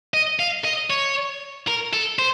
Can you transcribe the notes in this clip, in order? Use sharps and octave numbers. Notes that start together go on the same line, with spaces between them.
D#5
F5
D#5
C#5
A#4
A4
C5